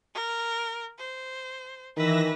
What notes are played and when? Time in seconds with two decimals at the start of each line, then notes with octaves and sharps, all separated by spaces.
0.14 A#4
0.99 C5
1.97 D#3 E3 B4 E5 A#6